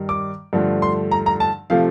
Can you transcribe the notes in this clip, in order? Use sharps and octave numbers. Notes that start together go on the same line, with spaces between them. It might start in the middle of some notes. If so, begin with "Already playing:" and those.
Already playing: G2 D#3 G3
D6
G2 D3 F3 A3
C6
A#5
A#5
A5
C3 F3 A3 F5